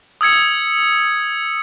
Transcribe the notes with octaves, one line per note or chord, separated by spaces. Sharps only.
D#6 E6 G#6 C#7